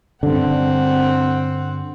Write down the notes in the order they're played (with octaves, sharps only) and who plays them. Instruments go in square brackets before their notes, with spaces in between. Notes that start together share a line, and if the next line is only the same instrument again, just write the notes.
[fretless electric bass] G2 D3 [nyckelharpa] C4 F#5